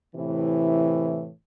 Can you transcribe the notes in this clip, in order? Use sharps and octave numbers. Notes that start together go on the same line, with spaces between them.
A2 C3 E3